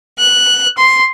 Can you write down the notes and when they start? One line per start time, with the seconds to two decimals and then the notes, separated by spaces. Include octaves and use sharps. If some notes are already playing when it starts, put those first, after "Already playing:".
0.18 F#6
0.76 C6